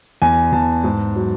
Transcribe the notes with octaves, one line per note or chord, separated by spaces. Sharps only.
E2 G#5
E2 A5
G#2
F#3